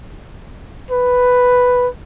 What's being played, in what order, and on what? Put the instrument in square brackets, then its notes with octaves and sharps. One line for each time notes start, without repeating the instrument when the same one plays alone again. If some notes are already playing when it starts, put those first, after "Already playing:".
[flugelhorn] B4